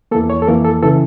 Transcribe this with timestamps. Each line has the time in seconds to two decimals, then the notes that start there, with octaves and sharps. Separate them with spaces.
0.11 A#3 A4
0.15 E2 E3
0.30 C#5
0.42 A4
0.48 F2 E3 A#3 A#4
0.65 A4
0.82 C#3 E3 A4